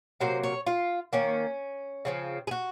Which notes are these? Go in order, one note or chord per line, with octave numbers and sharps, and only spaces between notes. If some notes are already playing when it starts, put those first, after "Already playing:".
C3 F#3 A#3 C5
C#5
F4
D#3 A#3 C#4
C#3 F3 C4
G#4
F#4